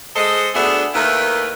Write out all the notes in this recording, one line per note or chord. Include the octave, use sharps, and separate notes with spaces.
G#3 A4 C5 D#5
D2 B3 D4 G#4 A4 E5
D#2 D#3 A3 E4 A#4 B4